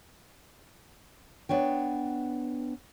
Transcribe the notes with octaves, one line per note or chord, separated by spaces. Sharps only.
B3 D4 C#5 G5